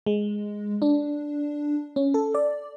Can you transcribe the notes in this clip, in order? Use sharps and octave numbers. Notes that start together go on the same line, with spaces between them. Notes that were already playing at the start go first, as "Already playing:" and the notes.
G#3
D4
C#4
A4
D5